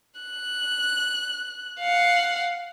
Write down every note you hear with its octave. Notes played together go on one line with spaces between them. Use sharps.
F#6
F5 F#5